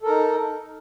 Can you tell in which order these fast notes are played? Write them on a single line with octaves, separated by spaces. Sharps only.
A4 A#4 D#4